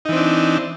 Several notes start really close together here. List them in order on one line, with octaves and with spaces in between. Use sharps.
D#4 E3 C4 D4